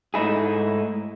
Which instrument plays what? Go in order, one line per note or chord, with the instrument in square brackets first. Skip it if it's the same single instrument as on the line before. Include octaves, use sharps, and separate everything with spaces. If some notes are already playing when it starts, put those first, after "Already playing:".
[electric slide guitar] G#2 A3 D#4 E4 G#4